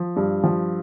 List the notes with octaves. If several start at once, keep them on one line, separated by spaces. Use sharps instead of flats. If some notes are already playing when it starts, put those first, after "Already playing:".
Already playing: F3
G2
F3